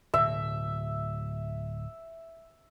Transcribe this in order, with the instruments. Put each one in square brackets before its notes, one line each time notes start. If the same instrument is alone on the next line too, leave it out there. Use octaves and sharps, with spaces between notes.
[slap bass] D1 B2 [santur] E5